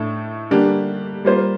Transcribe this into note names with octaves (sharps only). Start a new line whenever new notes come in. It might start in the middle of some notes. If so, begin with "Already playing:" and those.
Already playing: A2 A3 D4 A4
D3 G3 A#3 D4 G4
G3 A#3 F4 C5